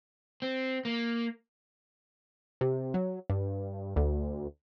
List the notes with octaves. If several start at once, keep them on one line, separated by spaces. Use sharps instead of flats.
C4
A#3
C3
F#3
G2
D2